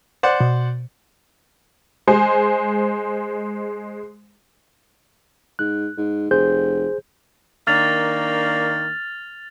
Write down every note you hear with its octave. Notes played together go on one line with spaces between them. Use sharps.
C5 D5 F#5
B2
G#3 C5 G#5
G#2 F#6
G#2
F1 G#4 C5 G6
D#3 A#3 D4 F6 A6 F7